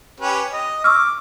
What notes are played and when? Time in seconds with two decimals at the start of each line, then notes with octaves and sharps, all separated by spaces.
0.20 C#4 G4 B4
0.53 D#5
0.84 C#6 D6 E6 F6